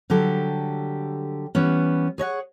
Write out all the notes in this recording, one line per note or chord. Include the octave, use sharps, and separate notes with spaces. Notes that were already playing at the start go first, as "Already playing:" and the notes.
D3 F#3 G3 G4 A4
E3 G3 B3 C#4
G#4 C#5 D#5 F#5